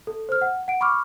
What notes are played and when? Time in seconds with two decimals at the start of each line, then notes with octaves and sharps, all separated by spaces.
0.07 A4
0.29 C5 F6
0.41 F#5
0.68 F#5 D7
0.81 B5 C#6 D6 F6